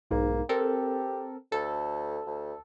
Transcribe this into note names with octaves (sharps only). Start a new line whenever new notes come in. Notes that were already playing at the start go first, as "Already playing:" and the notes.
B1 G#2 A#3
C4 G4 A4 A#4
D2 A4
D2